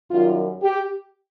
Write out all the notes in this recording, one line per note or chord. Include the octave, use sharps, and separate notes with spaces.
F#2 D#3 G3 F4
G4